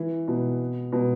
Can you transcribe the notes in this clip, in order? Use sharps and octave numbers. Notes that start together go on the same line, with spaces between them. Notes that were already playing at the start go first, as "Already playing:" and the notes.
Already playing: E3
B2
B2